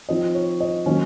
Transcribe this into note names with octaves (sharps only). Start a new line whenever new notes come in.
F3 C4 D#4 D#5
C#5
D#5
D#3 F#3 A#3 C#4